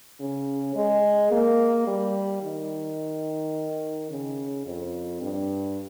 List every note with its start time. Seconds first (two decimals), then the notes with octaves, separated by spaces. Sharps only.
0.20 C#3
0.75 G#3
1.31 A#3
1.87 G3
2.43 D#3
4.10 C#3
4.66 F2
5.22 G2